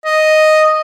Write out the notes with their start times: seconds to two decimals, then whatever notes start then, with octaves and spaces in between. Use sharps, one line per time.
0.05 D#5